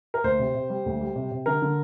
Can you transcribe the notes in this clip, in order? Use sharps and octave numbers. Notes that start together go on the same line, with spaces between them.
A#4
D2 C5
C3
C3
G3
D2
G3
C3
C3
D3 A#4
D3